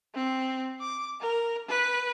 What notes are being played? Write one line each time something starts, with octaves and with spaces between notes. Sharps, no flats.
C4
D6
A#4
B4